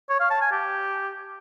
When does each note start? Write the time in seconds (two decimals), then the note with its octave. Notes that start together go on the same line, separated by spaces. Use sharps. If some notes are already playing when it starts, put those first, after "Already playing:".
0.09 C#5
0.20 F5
0.31 A5
0.41 G#5
0.52 G4